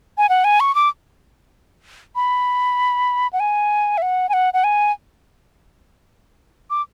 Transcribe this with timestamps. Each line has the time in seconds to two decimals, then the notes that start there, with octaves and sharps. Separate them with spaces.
0.18 G#5
0.29 F#5
0.44 G#5
0.60 C#6
0.75 D6
2.15 B5
3.33 F#5
3.40 G#5
3.98 E5
4.02 F#5
4.29 G#5
4.33 F#5
4.54 F#5
4.64 G#5
6.70 D6